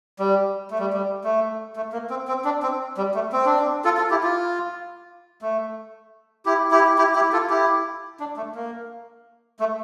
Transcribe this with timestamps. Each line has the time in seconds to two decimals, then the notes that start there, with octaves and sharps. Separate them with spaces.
0.19 G3
0.71 A3
0.79 G3
0.93 G3
1.24 A3
1.76 A3
1.93 A#3
2.10 C4
2.28 C4
2.45 D4
2.63 C4
2.97 G3
3.14 A3
3.32 C4
3.46 D4
3.59 C4
3.84 F4 A4
3.97 F4 A4
4.10 E4 G4
4.23 F4
5.42 A3
6.46 E4 G4
6.71 E4 G4
6.98 E4 G4
7.15 E4 G4
7.33 F4 A4
7.50 E4 G4
8.20 D4
8.37 A3
8.55 A#3
9.60 A3